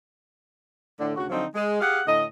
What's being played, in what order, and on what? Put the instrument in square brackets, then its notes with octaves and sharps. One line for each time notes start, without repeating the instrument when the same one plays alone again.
[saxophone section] A2 D3
D2 C#3 F#4
D3 F3 F#3 C4 D#4
G#3
G4 G#4 F5 F#5
A2 D3 D#5